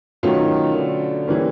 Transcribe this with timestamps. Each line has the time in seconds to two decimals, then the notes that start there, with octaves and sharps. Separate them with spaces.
0.23 B2 D#3 F#3 A3 C#4 F4
0.75 D3
1.27 E3 G3 A#3 C#4